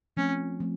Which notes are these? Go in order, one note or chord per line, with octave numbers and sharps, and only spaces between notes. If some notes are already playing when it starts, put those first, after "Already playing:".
F3 A3 C4 C#4
F3 A3 C4